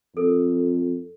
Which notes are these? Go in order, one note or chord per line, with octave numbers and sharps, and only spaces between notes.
F2 A4 A#4